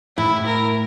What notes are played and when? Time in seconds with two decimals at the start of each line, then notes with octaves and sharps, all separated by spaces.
0.17 A2 E4
0.46 A#4